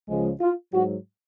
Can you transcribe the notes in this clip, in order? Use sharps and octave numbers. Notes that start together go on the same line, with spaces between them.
C#2 C#3 F3 G#3
F4
G#2 F#3 F#4